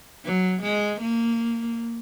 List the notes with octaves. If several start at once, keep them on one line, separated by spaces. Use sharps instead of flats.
F#3
G#3
A#3